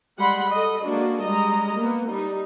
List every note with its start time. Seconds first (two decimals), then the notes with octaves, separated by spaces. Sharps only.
0.18 G3 G#3 F#5 B5 C6
0.52 A4 D#5
0.85 G#3 A#3 D4 F#4
1.22 G3 G#3 D#5 A#5
1.76 A#3 B3
2.08 G3 D#4